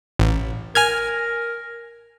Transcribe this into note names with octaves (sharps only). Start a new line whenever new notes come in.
A1
A#4 G#5 F6 G#6